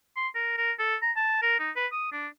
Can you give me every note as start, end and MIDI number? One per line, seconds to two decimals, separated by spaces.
0.17 0.28 84
0.35 0.54 70
0.57 0.72 70
0.79 0.95 69
1.02 1.12 82
1.16 1.42 81
1.42 1.59 70
1.60 1.70 63
1.76 1.87 71
1.92 2.12 87
2.12 2.28 62